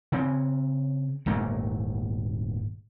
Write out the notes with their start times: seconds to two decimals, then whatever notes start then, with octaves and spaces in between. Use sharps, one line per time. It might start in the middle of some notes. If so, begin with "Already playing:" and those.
0.12 C#3 C4
1.26 D#1 G#2 A3 A#3